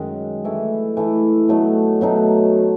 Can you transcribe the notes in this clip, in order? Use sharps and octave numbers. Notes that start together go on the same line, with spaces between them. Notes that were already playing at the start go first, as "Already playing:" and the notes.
Already playing: F#2 D#3 G#3
E3 A3 E4
E3 A3 E4
B2 F#3 A3 D#4
B2 F#3 A3 D#4